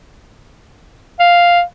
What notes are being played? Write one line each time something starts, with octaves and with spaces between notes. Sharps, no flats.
F5